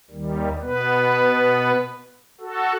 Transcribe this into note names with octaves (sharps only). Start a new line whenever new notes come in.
D#2 D#3 G3
B2 B3 B4
F#4 A4